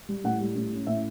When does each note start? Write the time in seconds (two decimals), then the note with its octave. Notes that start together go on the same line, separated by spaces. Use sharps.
0.09 G3
0.24 A2 F#5
0.40 G3
0.55 A2
0.72 C#4
0.87 A2 E5